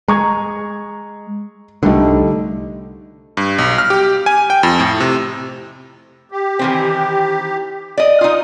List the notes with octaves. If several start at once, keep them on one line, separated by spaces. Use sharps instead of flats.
G#3 A#5 C#6 G#6
C2 D3 G3 A3 D#4
G2
B1
F6
G4
G#5
G5
F2
A2
C3
G4
D#3 E3 C4
D5 D#5
D#4 F4 D#6